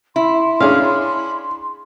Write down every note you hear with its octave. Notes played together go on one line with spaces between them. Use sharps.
E4 C6
C#4 D4 G#4 F5